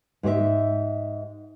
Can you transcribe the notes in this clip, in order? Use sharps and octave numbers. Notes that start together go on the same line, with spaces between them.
G#2 G4 C5 E5